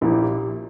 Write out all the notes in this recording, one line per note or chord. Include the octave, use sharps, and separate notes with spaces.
A#1 A#2 A#3 E4 G4